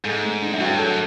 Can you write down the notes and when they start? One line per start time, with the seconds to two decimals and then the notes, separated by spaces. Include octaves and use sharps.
0.05 G#2 A4
0.23 A3
0.42 D4
0.53 F#2
0.60 G2 F#4
0.78 F#2 A4